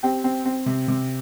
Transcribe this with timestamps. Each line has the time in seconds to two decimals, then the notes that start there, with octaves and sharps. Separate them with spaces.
0.03 C4 G4
0.24 C4
0.45 C4
0.66 C3
0.88 C3